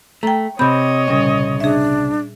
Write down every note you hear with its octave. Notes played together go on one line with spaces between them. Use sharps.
A3 G5 A#5
C3 C4 C#5 D#5 B5 G6
C2 A#2 C#3 G3 C#4
D4 G#4 E5